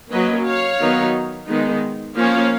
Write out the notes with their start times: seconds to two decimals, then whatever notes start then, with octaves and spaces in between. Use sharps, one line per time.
0.11 F#3 A#3 C#4 B4 D#5
0.45 C#5 F5
0.79 D#3 F#3 B3 D#4
1.48 D#3 G#3 B3 D#4
2.16 F3 A#3 C#4 C#5 F5